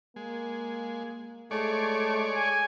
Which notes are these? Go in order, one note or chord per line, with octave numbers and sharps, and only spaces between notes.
G#3 A#3
G#3 A3 G#4 C#5 D5
G#5